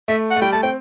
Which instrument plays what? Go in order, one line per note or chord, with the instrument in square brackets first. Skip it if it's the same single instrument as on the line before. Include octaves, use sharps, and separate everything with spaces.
[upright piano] A3 [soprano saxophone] E5
[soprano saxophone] F#5
[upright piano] A3
[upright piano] G3 [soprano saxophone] G5
[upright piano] A3 [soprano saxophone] A5
[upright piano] C4 [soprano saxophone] G5